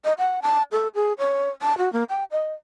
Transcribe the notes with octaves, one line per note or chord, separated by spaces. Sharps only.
D#5
F#5
A5
A4
G#4
C#5
A5
F#4
A#3
G5
D#5